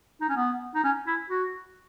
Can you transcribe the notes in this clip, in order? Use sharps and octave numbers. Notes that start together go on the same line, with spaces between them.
D#4
C#4
B3
D#4
C#4
E4
F#4